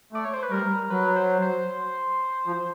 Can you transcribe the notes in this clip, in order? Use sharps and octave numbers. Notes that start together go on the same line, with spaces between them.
A3 D5
C#5
C5
B4
G3 A#4
F#3 B4
C5
C5
F3